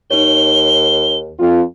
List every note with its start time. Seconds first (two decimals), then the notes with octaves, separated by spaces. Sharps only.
0.11 D#2 D#4 C#5 G7
1.39 F2 F4